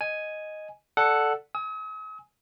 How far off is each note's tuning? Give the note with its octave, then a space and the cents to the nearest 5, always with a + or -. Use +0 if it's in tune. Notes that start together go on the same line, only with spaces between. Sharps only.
D#5 +0 G#5 +0
A4 +0 D5 +0 F#5 +0
G#5 +0 D#6 +45